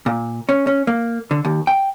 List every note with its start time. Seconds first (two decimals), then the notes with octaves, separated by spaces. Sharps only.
0.06 A#2
0.49 C#4
0.67 C#4
0.87 A#3
1.31 D3
1.45 D#2
1.67 G5